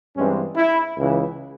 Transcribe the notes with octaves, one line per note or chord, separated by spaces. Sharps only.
G2 E3 G#3 C4 C#4
E4
C#2 C#3 E3